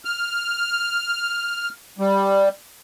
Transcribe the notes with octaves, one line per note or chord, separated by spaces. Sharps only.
F6
G3